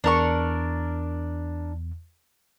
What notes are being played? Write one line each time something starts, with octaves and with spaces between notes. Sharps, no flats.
E2 D4 A#4 C#6